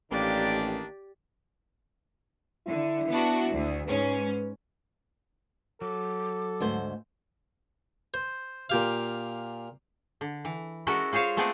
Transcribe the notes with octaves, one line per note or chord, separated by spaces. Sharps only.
A1 D#3 A#3 D4 G4 D5
D3 E4
B3 D4 F#4
D2
G#2 C#4 B4
F#3 A4 D6
D2 G#2 C5
C5
A#2 G4 F5
D3
E3
G#3 C#4 E4 F#4 A4 A#4
F4 G#4 C5 C#5 F5
A3 B3 C4 G#4 A4 D5